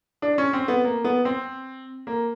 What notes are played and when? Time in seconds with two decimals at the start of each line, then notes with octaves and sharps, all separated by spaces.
0.22 D4
0.38 C#4
0.53 C4
0.68 B3
0.84 A#3
1.04 B3
1.25 C4
2.07 A#3